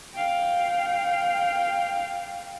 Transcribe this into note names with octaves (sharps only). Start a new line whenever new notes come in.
F5 G5